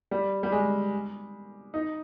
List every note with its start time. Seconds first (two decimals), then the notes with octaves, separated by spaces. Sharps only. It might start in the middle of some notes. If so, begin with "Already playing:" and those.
0.11 G3
0.43 G3
0.52 G#3
1.74 D#4